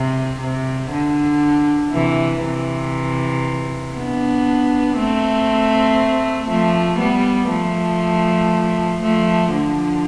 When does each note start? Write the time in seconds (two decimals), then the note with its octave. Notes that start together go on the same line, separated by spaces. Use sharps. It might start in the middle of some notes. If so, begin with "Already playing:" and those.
Already playing: C3
0.41 C3
0.92 D3
1.92 C3 E3
2.43 C3 E3
3.95 B3 D4
4.97 A3 C4
6.48 F3 A3
6.99 G3 B3
7.50 F3 A3
9.02 F3 A3
9.52 D3 F3